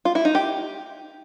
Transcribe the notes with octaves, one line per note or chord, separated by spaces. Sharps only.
F4
E4
D#4
G4